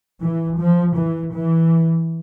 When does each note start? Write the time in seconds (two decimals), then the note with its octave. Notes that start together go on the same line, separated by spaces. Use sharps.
0.21 E3
0.58 F3
0.95 E3
1.32 E3